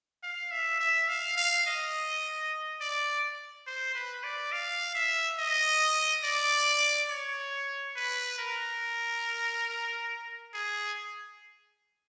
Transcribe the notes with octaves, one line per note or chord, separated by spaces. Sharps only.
F5
E5
E5
F5
F5
D#5
D5
C5
B4
D5
F5
E5
D#5
D5
C#5
B4
A#4
G#4